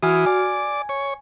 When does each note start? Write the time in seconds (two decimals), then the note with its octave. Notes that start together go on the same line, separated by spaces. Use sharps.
0.03 E3 F#4 G#5 D#6 F6
0.26 D5 G#5
0.89 C#5